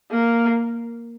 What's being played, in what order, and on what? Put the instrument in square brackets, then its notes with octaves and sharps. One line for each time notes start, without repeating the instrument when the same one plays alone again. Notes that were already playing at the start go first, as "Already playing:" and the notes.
[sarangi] A#3